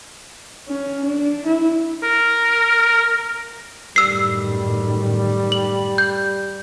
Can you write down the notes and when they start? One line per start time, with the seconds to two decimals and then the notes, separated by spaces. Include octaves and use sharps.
0.68 C#4
1.03 D4
1.47 E4
2.03 A#4
3.96 F#2 A2 D#3 G3 E6 C7
5.52 F#7
5.98 G6